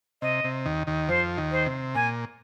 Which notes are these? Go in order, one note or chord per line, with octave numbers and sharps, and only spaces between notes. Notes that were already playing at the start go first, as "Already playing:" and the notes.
C3 D#5
C3
D#2 D#3
D#2 D#3
F2 F3 C5
D#2 D#3
C5
C3
A#2 G#5